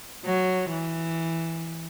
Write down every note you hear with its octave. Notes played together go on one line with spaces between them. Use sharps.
F#3
E3